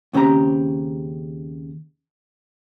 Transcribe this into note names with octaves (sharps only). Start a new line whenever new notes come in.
D#2 C#3 C4 G4 A#5